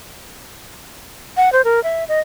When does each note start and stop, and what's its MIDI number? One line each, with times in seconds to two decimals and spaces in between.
1.37 1.52 78
1.53 1.62 72
1.65 1.83 70
1.84 2.04 76
2.08 2.20 75